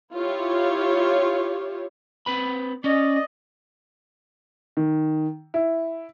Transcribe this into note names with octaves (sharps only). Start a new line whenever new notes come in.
E4 F4 G4 C#5
C4 B4 B5
C#4 D5 D#5
D#3
E4